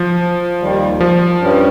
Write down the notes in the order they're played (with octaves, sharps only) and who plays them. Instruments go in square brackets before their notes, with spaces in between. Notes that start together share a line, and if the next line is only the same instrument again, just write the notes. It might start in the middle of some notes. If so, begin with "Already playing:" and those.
Already playing: [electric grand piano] F3
[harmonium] D#2 D#3 G3
[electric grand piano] F3
[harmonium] G2 G3 C#4